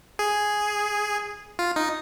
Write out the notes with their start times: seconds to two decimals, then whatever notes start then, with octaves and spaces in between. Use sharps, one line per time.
0.19 G#4
1.59 F4
1.76 D#4